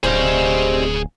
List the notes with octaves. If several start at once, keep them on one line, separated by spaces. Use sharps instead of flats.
D1 G3 C4 D#4 E4 G#4 C5 F5